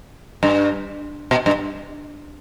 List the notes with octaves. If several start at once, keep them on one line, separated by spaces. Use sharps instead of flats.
G2
B2
G2